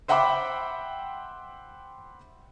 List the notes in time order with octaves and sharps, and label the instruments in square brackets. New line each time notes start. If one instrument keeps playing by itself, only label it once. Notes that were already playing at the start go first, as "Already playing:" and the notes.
[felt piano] C5 E5 F#5 G5 B5 D6